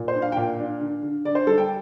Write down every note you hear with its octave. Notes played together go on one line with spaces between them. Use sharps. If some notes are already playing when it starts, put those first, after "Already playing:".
Already playing: A#2
C5
D4
F5
G5
A#2 F5
D4
D3
D3
D3 D5
C5
G3 A4
G5